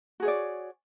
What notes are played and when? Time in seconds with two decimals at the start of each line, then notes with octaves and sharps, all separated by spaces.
0.20 F#4
0.22 G#4
0.25 C#5
0.28 D5